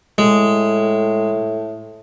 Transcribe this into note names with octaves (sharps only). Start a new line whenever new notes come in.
A2 G#3